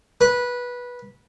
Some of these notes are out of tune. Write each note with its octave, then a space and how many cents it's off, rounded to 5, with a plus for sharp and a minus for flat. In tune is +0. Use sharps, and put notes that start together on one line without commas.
B4 -15